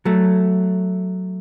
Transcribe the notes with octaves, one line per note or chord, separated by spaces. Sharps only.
F#3 A3